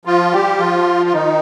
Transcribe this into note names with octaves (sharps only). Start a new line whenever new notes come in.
F3 F4
G3 G4
F3 F4
F4
D#3 D#4